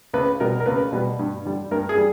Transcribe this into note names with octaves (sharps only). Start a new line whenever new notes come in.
C#2 B4
B2 G3 A#4
A#4
C#2 B4
B2 G3
G2
D3 G3
G2 A#4
G#4
G3